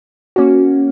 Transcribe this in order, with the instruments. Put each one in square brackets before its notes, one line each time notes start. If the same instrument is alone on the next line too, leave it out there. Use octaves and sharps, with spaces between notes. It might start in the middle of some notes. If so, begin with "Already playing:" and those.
[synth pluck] A#3 C#4 F#4